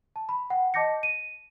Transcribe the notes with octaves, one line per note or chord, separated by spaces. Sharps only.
A5
B5
F#5 G5
D#5 A5 D6 G6 A#6 C#7
D#7